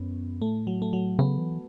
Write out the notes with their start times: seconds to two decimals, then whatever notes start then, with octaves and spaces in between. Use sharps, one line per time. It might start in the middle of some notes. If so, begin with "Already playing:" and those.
Already playing: F#2 B3 C#4
0.42 A2 A3
0.67 F#3
0.82 A3
0.93 F#3
1.19 C#3 B3
1.38 E3